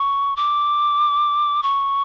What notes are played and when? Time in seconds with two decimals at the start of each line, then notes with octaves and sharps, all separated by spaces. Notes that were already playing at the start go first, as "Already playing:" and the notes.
Already playing: C#6
0.36 D6
1.63 C#6